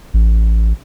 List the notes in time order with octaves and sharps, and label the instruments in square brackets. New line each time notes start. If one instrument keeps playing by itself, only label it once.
[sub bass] A1